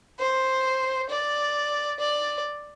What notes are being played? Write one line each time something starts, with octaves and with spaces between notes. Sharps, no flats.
C5
D5
D5